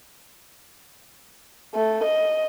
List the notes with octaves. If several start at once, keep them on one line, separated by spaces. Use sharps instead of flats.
A3
D#5